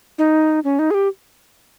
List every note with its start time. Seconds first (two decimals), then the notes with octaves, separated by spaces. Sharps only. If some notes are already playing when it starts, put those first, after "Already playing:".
0.18 D#4
0.64 C#4
0.79 D#4
0.91 G#4
0.94 G4